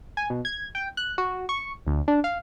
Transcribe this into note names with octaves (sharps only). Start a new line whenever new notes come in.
G#5
B2
G#6
G5
F#6
F#4
C#6
D2
D4
F5